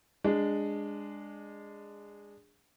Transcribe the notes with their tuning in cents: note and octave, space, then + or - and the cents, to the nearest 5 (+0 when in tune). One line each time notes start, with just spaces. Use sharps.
G#3 -15 D4 +0